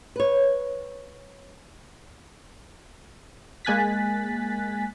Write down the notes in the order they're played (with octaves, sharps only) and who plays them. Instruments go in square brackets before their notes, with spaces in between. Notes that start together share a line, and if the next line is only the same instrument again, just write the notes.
[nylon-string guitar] B4 C#5
[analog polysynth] G#3 A#3 G#5 F#6 A6 B6